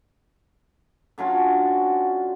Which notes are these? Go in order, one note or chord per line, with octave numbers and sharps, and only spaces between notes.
D3 F#3 C#4 F4